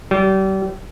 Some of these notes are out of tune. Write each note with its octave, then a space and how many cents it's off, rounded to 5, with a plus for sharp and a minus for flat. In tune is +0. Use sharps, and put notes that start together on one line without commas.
G3 -35